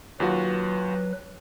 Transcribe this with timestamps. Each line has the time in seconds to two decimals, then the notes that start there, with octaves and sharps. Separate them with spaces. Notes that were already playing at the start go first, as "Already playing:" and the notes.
0.20 D#2 F#3 F4 F#4 B4